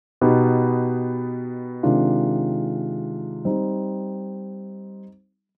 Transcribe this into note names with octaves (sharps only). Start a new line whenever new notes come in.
B2 B3 D#4 G4
C3 D#3 G#3 D4 F4
G3 C4 D#4